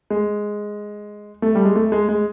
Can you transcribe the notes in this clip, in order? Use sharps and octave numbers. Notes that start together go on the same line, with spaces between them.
G#3
A3
G3
G#3
A3
G#3
G#3